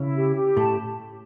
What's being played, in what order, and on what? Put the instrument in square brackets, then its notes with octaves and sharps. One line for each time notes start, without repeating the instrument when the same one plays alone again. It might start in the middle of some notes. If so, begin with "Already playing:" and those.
Already playing: [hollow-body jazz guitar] C#3 C#4 [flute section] E4
[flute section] G4
G4
[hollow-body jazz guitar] A2 A3 [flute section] A5